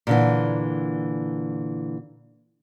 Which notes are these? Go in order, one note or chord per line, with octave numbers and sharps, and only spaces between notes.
A#2 D3 E3